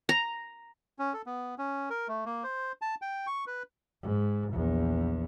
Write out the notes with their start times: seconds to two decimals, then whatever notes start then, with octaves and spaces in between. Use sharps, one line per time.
0.09 A#5
0.99 C#4
1.13 A4
1.26 B3
1.58 C#4
1.90 A#4
2.08 A3
2.26 A#3
2.44 C5
2.82 A5
3.02 G5
3.27 C#6
3.47 B4
4.03 G#2
4.50 A#1 E2